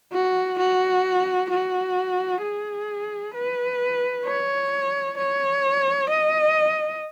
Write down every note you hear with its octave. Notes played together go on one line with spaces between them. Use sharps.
F#4
F#4
F#4
G#4
B4
C#5
C#5
D#5